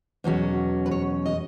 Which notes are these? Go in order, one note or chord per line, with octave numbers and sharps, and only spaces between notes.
E2 B2 F#3 C#4
B4
C#5
D#5